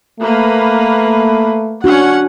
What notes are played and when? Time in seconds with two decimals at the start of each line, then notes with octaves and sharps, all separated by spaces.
0.20 A3 A#3 B4
1.84 C#4 D4 F#4 F#5